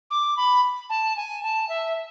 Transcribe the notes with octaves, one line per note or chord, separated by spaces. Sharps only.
D6
B5
A5
G#5
A5
E5